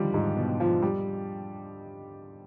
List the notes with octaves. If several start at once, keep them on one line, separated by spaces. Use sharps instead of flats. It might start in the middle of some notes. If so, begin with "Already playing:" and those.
Already playing: D3 D#3 F3 G3
G#2
B2
F3
G3